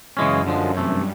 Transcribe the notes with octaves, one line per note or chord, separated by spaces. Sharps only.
F#2 C#3 E3 G#3 C#4
D3 F3 G#3
G2 C3 E3 A3